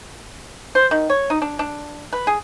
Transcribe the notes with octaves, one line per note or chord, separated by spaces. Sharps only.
C5
D#3
C#5
D#4
D4
D4
B4
G#4